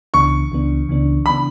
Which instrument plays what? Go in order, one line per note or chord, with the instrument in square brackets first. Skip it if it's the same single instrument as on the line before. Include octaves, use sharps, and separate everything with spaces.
[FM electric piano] C#2 C#3 E3 B3 D4 [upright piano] C#6
[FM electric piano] C#2 C#3 E3 B3 D4
C#2 C#3 E3 B3 D4
[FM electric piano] C#3 E3 B3 D4 [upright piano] B5